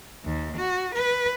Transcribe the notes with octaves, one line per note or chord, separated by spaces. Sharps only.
D#2
F#4
B4